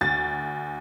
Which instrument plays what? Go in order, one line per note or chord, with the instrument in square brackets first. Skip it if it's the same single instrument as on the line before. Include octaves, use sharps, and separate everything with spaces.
[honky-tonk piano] D2 A6